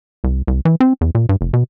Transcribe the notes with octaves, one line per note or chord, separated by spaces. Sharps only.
C2
C2
E3
C4
E2
A#2
G2
F1
B2